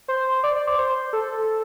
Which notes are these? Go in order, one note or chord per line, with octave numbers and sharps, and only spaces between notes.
C5
D5
D5
C5
C5
A4